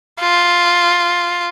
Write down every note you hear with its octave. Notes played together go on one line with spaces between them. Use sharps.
F4